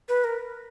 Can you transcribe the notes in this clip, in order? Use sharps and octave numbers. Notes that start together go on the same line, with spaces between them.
B4
A#4